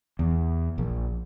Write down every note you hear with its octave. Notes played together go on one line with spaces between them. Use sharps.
E2
A#1